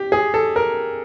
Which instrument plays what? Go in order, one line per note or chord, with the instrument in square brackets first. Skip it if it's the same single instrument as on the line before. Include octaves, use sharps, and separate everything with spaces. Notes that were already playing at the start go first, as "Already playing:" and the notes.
Already playing: [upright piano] G4
G#4
A4
A#4